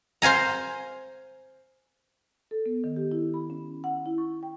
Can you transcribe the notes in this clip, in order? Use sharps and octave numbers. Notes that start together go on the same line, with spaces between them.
C5 F5 G#5 A#5
A4
B3
D#3
G4
E4
B5
C#4
F#5
E4
C#6
G5